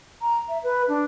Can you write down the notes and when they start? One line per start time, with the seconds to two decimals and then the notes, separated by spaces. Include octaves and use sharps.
0.22 A#5
0.48 E5
0.63 B4
0.88 D4